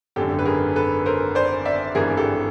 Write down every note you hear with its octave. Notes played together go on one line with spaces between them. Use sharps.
G#1 F#2 D3 G4 A4
B4
G#4 A#4
A4 B4
A#4 C5
C5 D5
D5 E5
G#1 G2 E3 G#4 A#4
G4 A4